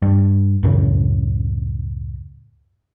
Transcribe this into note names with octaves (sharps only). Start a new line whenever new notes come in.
G2
C#2 F#2 A2 C#3